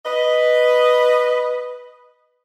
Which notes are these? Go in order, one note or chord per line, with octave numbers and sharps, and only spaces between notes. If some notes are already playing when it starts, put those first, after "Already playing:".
B4 D#5